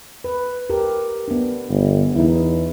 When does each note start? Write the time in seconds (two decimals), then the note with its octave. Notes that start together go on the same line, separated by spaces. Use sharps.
0.24 B4
0.70 G4 A#4
1.28 B3 D4
1.69 G1
2.15 E2 D#4 E4